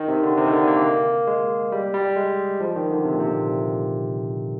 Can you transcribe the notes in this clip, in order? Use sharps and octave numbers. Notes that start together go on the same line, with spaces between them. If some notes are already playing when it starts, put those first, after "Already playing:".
Already playing: D#3
C3
D3
C3
D#3
D3
A#3
G#3
G3
G3
G#3
F3
D#3
D3
C3
A#2
C3